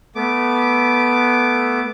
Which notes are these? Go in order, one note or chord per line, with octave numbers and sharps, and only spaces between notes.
A3 B3 D6